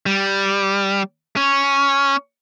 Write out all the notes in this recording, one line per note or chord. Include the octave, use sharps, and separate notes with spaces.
G3
C#4